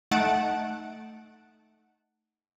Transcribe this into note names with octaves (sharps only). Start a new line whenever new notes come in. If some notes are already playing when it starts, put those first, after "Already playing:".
A3 D#4 F#5 A5 D7